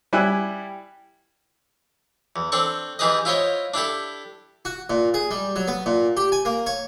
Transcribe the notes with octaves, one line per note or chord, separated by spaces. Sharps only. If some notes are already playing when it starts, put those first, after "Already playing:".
G3 E4 G#5 F#6
E2
C4 D4 A4 C#6
E3 D#4 G4 G#4 B4 D#5
E4 F4 C5 C#5 D#5
D4 E4 G4 A4
F#4
A#2
G#4
G3
F#3
B3
A#2
G4
G#5
A#3
C#5